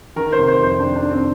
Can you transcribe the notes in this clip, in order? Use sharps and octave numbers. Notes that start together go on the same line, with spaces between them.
D#3 A#4
C5
C3
C5
F2 C5
F2 D4
D4
D#3
C4